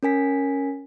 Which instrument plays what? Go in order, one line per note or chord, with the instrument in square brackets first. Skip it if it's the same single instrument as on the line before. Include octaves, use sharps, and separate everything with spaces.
[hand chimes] C#4 A#4 G#5 B6